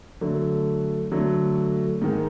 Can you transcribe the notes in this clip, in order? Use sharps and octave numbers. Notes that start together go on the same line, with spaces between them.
D3 F#3 A3
D3 F#3 A3
G#2 D#3 G#3